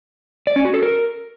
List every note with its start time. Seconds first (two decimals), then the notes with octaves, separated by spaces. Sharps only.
0.47 D5
0.56 C#4
0.65 F#4
0.74 A4
0.83 A#4